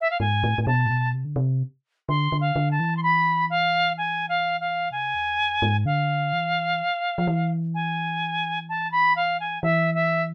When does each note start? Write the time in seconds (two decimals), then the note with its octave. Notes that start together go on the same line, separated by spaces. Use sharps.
0.01 E5
0.10 F5
0.20 G#2 G#5
0.44 A2
0.58 A2
0.63 G#5
0.67 B2 A5
0.86 A2
0.90 B2
1.14 C3
1.25 D3
1.36 C3
2.09 D3 C6
2.32 D3
2.40 F5
2.56 D3
2.71 A5
2.80 E3
2.97 C6
3.03 B5
3.50 F5
3.97 G#5
4.29 F5
4.60 F5
4.91 C3 G#5
5.15 E2
5.39 F2
5.62 G#2
5.86 D3 F5
6.33 E3
7.18 F3
7.27 E3
7.74 G#5
8.69 A5
8.92 B5
9.16 F5
9.40 G#5
9.63 E3 E5
9.94 E5